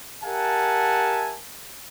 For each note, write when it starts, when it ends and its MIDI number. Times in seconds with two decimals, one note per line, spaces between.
0.24 1.38 67
0.24 1.38 70
0.24 1.38 76
0.24 1.38 78
0.24 1.38 80
0.24 1.38 81